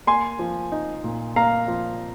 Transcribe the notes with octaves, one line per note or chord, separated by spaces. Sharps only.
A#3 G#5 C6
F3
D#4
A#2
A#3 F5 A#5
F3